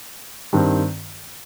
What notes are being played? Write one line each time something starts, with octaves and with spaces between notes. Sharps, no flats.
G2 D#3 G3 C4